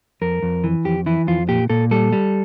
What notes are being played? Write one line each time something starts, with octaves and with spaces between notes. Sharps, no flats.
F2 A#4
F2
E3
F2 G4
E3 E4
F2 F4
A#2 G4
A#2 A4
G3 A4
G3